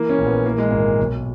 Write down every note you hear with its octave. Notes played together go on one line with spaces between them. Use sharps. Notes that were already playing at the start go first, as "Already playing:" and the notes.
Already playing: E3 A#3
C#4
A#1
B3
E3 A#3
G#3
G#1 A#3
B1